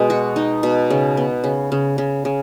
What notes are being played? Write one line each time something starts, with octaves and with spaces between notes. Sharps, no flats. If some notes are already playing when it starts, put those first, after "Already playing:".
Already playing: B2 G#3
F#4
D#4
B2
C#3
B3
C#3
C#3
C#3
C#3